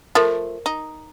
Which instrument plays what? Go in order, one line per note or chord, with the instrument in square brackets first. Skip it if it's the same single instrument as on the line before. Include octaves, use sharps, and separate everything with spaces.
[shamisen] F3 A3 [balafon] A#4
[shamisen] D#4